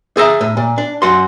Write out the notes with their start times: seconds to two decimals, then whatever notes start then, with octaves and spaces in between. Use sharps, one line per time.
0.17 G#4 E5 A#5
0.41 A2
0.57 A#2
0.78 D4
1.02 F#2 F#4 C6